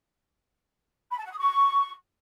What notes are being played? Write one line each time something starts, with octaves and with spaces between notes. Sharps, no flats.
B5
A5
F#5
D#6
C#6